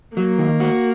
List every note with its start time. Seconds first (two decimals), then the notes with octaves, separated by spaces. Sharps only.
0.17 F#3 A#3
0.39 D#3
0.60 F#4